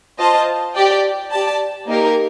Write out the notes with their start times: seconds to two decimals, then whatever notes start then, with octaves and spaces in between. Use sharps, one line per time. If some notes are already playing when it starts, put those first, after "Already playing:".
0.19 F4 C5 D#5 A5
0.75 G4 D5 G5
1.31 G4 D5 A5
1.87 A#3 D#4 G4 A#4